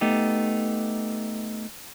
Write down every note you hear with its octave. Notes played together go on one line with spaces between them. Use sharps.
A3 B3 D#4 G4